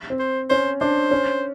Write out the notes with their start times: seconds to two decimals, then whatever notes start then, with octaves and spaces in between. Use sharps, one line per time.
0.10 C4
0.19 C5
0.50 C#4 C5
0.81 D4 C5
1.11 C#4